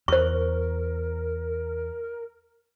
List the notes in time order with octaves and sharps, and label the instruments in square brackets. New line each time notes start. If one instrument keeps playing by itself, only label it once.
[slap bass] E2 [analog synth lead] A#4 [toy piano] C5 C#6